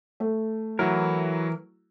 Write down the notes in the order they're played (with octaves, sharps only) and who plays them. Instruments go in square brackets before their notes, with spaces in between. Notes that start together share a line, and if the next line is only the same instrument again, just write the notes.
[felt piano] A3
[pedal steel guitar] E3 A#4 [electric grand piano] F#3 E4 F#4